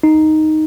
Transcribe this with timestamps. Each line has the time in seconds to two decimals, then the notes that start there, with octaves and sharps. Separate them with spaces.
0.03 D#4